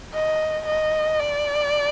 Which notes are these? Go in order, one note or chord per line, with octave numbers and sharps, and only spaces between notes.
D#5
D#5
D5